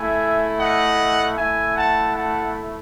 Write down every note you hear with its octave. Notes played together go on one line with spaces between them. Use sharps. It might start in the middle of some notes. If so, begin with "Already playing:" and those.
Already playing: A3 E4 E5 G#5
D#5 F#5
A3 E4 E5 G#5
F#5 A5
F#5 A5